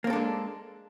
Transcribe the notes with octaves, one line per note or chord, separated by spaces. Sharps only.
G#3 A#3 C4 D4 A4